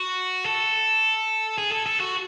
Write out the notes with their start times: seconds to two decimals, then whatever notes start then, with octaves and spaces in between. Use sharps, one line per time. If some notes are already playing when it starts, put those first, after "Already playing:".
Already playing: F#4
0.46 A4
1.58 G#4
1.72 A4
1.86 A4
2.00 F#4